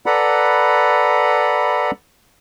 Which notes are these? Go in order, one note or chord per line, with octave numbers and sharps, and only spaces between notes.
A4 B4 D5 F#5 A#5 B5